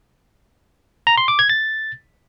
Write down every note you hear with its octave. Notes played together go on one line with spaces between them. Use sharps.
A#5
C6
D6
G#6
A6